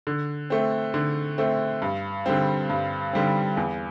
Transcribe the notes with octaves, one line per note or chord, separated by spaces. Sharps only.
D3
A3 C4
D3
A3 C4
G2
D3 G3 C4
G2
D3 G3 C4
E2